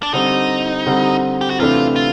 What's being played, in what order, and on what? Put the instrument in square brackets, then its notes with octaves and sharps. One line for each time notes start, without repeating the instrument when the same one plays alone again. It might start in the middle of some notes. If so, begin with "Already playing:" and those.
[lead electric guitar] D4
[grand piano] D3 G3 C4 [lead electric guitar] D#4
[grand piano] D3 G3 C4
[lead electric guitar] G4
F#4
[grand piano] C3 E3 A3 D4 [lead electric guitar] F4
[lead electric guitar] F4